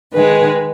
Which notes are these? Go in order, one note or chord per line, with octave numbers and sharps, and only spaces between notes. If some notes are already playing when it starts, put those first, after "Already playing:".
D#3 G#3 B4